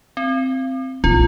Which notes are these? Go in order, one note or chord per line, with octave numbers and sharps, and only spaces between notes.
C4
A#1 E4 F4